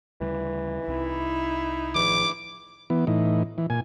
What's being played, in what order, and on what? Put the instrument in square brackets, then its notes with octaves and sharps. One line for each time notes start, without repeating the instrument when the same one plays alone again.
[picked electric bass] D2 C#3 G3 [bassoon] E3
[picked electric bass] C2 C3 [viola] D#4 E4
[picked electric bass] A1 D#3 F3 [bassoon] E2 [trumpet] D6
[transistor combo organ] E3 B3
A2 E3 D#4
E3
A#2 G#5